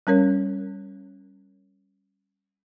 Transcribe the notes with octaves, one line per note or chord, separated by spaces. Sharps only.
G3 C#4 A#4 C#5